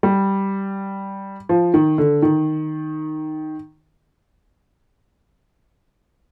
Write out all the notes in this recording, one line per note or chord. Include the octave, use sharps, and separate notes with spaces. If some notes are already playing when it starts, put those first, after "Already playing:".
G3
F3
D#3
D3
D#3